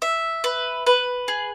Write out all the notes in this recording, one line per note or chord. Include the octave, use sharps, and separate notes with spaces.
E5
B4
B4
G#4